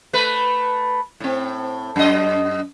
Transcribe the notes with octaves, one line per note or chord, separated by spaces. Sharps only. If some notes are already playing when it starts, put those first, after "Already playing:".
A3 B4
A2 C4
F#2 D#5